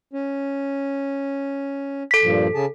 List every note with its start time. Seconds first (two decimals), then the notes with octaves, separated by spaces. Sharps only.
0.13 C#4
2.11 A4 B6
2.23 G2 A#2 F3
2.55 C#3 G#4 A5